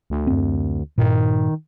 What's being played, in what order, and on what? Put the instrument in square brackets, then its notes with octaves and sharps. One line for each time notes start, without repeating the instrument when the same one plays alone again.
[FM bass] D2
[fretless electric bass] F#2 C4
[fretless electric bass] G2 A#2 [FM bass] D#3